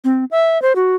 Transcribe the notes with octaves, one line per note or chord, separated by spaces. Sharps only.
C4
E5
C5
F#4